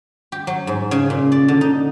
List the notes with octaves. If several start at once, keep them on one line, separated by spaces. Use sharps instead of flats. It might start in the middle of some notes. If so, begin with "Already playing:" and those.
G4
F#3
G#2
C#3
A#2
D5
D3
D#4